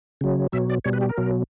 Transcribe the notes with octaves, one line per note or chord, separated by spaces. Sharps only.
C#3 F#3
B2 F#3 E5
D5
B2 G3 C#5
B4
G4
A#4
B2 F#3